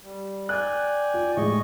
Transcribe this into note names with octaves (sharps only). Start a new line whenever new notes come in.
G3
D5 G5 G#5 F#6
F4
A2 G#3 D#5 C#6